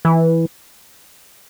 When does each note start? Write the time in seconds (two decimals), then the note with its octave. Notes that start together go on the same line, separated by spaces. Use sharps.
0.05 E3